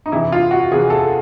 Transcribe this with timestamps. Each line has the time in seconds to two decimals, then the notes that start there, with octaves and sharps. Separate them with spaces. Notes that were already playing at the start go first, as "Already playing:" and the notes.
0.06 D#4
0.12 E2 C3 E3 E4
0.32 F4
0.51 F#4
0.71 E2 C3 E3 G#4
0.90 A4